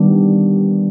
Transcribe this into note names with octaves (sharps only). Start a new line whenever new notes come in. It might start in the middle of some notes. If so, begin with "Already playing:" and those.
Already playing: D#3 G3 B3 D4 G4